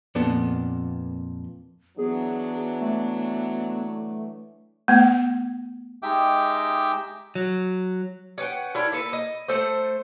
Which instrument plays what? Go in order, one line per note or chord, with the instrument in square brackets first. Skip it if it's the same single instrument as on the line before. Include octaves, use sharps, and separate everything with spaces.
[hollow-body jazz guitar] F2 A#2 B3 D4 A4
[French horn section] E3 F#3 D4 [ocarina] B3 [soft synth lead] G#4
[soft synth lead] A3
[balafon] A3 B3
[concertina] G#3 D#4 G4 E5 G5 D6
[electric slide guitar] F#3
[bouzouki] C#4 B4 F#5 G5
D4 E4 A#4 C#5
A#3 A4 B4
D#5
A3 A4 C5